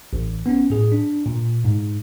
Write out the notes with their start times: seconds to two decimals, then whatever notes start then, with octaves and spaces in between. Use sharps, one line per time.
0.13 A1
0.46 B3 C#4
0.70 A2 G#4
0.92 D4
1.26 A#2
1.65 G#2